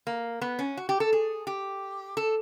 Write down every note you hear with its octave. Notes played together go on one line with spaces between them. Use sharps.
A#3
B3
C#4
F#4
G4
A4
G#4
G4
A4